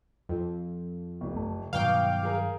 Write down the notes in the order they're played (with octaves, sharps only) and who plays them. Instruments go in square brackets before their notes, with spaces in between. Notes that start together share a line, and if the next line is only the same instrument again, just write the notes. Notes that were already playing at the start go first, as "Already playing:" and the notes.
[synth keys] F2
[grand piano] F1
[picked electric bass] F#1 A3
[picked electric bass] G2 D#3 F#3 [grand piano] B2 [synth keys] F5 G5 D6
[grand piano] G#4 A#4